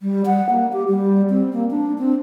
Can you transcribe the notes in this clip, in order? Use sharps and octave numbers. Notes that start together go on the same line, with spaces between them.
G3
F#5
A#3
G4
G3
C4
A#3
D4
C4